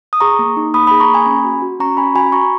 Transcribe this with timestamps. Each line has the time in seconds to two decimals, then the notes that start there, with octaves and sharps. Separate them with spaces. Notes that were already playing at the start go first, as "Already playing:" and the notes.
0.13 D#6
0.20 G#4 A#5 C#6
0.39 A#3
0.57 D#4
0.74 A#3 B5 D#6
0.87 G#4 B5 D#6
1.00 A#5 C#6
1.09 A#3 G#5 B5
1.26 C#4
1.45 F#4
1.62 F#4
1.79 C#4 A#5 C#6
1.97 C#4 G#5 B5
2.15 F#4 G#5 B5
2.32 F#4 A#5 C#6